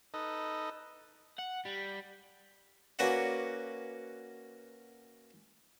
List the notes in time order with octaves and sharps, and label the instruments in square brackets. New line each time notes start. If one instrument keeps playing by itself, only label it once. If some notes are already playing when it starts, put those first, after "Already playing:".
[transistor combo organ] D#4 A4 B4 D#5
[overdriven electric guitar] F#5
G3
[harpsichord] A#3 C#4 F#4 B4 D5 F#5